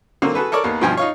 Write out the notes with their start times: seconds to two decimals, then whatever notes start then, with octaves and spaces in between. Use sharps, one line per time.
0.22 D3 F#3 A#3 C4 F#4
0.35 F#4 G#4 A4 B4
0.52 A4 A#4 C#5 D5
0.64 D#2 A#3 B3
0.81 G2 B2 F3 G5 G#5
0.97 D#4 F4 C#5